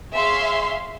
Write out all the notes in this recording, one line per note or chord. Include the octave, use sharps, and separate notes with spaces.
G#4 C#5 E5 F5 C6